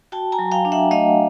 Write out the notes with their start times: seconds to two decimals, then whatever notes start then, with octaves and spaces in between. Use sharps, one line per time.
0.12 F#4 G5 A5
0.32 G#5 A#5
0.39 F#3
0.52 F5 G5
0.65 D4
0.72 E5 F#5
0.91 A3 D#5 F5